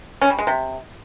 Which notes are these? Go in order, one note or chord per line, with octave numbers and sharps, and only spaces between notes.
C#4
G3
G#3
C3